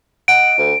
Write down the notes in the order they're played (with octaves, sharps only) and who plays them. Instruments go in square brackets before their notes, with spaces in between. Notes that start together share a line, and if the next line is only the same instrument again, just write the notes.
[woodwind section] D#5 F#5 [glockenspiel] D7
[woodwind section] D2